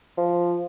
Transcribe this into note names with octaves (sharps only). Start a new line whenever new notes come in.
F3